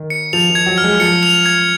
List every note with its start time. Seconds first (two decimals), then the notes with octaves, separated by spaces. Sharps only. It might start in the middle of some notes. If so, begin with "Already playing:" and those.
Already playing: D#3
0.10 C#7
0.33 F3 F7
0.50 F3
0.55 G#6
0.66 F#3
0.78 F6
0.84 G#3
1.00 F3 C#7
1.23 F7
1.46 G#6